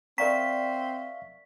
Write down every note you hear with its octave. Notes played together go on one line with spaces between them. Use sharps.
C4 A#4 D5 E5 F5 A#5 C#6 B6